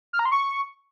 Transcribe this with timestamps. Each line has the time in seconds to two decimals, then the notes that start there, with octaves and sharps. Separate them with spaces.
0.13 F6
0.19 A#5
0.25 C6
0.32 C#6